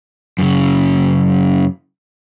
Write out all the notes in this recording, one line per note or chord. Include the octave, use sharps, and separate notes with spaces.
F#2 C#3